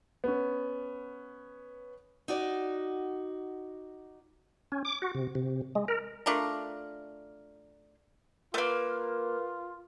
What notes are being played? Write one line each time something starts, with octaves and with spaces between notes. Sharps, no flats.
B3 C#4
D#4 F#4 D5
C#4
D6
F#4
C3
C3
G#3
A#4
A3 D4 F4 A#4
A3 A#3 F4 A#4 B4